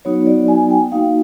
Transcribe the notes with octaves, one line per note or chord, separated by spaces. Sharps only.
F#3 B3 D#4 F#4 C#5
D5
G#5
G5
A#3 D#4 F#4 F5